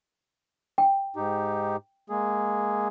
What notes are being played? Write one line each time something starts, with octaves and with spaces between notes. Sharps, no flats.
G5
G#2 D#4 G4
G#3 A#3 G#4